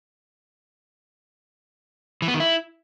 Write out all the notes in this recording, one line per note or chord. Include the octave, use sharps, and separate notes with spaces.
E3
B3
D#3
E4